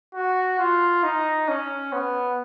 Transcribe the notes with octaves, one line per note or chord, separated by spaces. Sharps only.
F#4
F4
D#4
C#4
B3